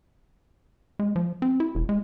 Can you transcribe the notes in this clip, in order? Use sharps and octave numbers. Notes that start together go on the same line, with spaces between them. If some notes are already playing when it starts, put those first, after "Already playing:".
G#3
F3
C4
E4
E1
G#3